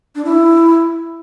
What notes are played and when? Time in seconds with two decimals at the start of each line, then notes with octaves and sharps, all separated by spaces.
0.15 D4
0.25 E4